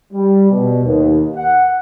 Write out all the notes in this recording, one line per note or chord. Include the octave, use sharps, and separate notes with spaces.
G3
B2
D#2
F#5